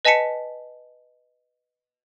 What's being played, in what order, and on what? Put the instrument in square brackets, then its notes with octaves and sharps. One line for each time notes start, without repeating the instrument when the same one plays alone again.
[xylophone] B4 D#5 G#5 A5 B6 C#7